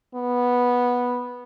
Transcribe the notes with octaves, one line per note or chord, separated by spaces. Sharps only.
B3